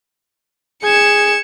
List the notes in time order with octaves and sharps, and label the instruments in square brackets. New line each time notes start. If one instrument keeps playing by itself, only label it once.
[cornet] G#4 [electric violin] G#6 [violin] C#7 E7